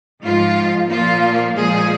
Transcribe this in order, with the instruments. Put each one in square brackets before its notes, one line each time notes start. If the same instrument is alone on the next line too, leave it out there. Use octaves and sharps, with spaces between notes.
[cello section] G#2 F3 G#3 F4
A#2 F3 A#3 F4
A#2 F3 G#3 G#4